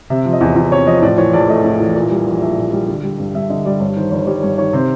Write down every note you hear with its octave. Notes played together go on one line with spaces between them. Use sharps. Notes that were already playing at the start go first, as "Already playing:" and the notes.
C3 E5
F3
D#5
E2
E2
C3 C#5
F3 D#5
A2 D5
E3 C#5
A#1 D5
A3 D#5
A2
E3
A#2
G3
A#1
A#1 E5
A#2
G3
D3
G3
G2
G2 E5
D3 D#5
G3 D5
G2 C#5
D#3 C5
G1 C#5
G3 C#5
G2 C#5
D#3 C#5
C3 C5